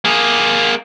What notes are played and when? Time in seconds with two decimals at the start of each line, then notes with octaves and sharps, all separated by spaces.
0.05 A#3 G#4